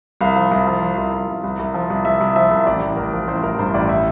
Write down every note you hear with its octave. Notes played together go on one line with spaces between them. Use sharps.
C2 F5
F3
C2
F3
F3
C2
C2
C2
C2
C2
F3
C2
C2 E5
C2
F3 E5
C2
A1 D5
A1
A1 A#4
F3
A1 C5
A1 A#4
G2 C5
A1 D5
E5